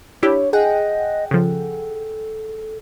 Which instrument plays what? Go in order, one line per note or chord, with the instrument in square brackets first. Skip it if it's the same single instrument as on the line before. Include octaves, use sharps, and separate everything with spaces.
[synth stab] D4 E4 G4 [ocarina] C#5
[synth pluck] G#4 F#5 G5 [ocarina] D#5
[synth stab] C#3 F3 [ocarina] A4